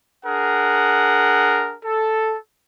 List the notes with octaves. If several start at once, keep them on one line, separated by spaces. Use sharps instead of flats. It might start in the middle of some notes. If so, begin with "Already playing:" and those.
D4 G#4 A#4 F#5
A4